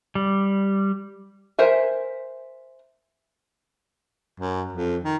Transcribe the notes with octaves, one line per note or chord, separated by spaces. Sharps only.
G3
A#4 C5 E5 G#5
F#2
F2
D#3